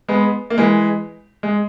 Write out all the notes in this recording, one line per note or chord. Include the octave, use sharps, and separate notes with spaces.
G#3 B3
A#3
E3 G#3
G#3